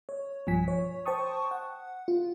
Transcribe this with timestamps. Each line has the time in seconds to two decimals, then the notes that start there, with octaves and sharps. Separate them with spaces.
0.09 C#5
0.47 B1 G2 F3 G#5 B6
0.68 C#5
1.06 C5 G5 A5 C#6 D#6
1.51 F#5
2.08 F4